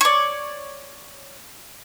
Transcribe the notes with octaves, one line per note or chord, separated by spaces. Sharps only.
C#5 D5